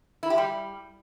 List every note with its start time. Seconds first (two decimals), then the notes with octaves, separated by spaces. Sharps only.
0.23 E4
0.30 G4
0.38 G3